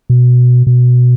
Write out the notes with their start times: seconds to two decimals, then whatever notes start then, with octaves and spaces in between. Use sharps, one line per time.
0.10 B2
0.67 B2